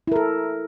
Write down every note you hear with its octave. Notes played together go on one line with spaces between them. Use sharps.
E4 A4 A#4